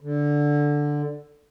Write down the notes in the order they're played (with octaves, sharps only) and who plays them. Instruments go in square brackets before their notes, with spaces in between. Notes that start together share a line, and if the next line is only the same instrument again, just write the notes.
[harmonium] D3